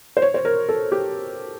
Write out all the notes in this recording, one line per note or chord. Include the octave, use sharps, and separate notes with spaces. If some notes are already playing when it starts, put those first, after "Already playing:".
C5
C#5
C5
A#4
A4
G4